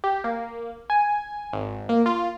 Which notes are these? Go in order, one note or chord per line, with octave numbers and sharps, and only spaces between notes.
G4
A#3
G#5
G#1
A#3
F4